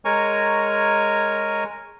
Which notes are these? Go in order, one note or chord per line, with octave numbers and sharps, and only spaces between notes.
G#3 A#4 C#5 G#5 A#5 C#6